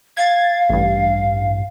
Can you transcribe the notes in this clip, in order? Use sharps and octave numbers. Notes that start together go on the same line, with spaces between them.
F5 G#6 A6
A1 G2